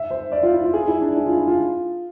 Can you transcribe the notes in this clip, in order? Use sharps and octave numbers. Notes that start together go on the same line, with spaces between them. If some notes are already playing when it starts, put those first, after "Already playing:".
Already playing: E5
C5
D5
F4
E4
F4
G#4
E4
D4
E4
F4
E4
F4